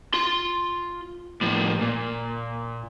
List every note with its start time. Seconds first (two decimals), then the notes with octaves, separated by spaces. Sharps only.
0.14 F4 C6
1.41 A2 F3
1.81 A#2